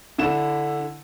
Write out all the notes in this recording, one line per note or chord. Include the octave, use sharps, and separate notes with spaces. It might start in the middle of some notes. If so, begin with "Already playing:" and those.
D3 E4 E7